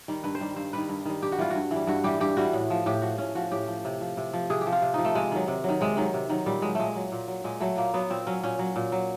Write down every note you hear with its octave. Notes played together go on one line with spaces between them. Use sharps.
D#3 G3
G2 B4
C5
D#3 G3
G2 C5
D#3 G3 B4
G2
D#3 G3
G2 G4
F#4
E3 G3 F4
G2 F#4
E3 G3
G2 F#4
E3 G3 G4
G2 G4
E3 G3 F#4
A2
F3
A2 G4
F3 F#4
A2 C#4
F3 F#4
A2 G4
F3
C3
F3
C3
F3
C3 G#4
G4
F3
F4
C3
F3 D#4
A3
C3 G#3
D#3 F#3
C3
D#3 F#3
C3 G#3
D#3 F#3
C3
D#3 F#3
A#2 G3
F#3 G#3
A#2 G#3 A3
F#3
A#2
F#3
A#2 G#3
F#3 A3
A#2 A#3
F#3 B3
A#2 C4
F#3 C#4
A#2 C#4
F#3
A#2
F#3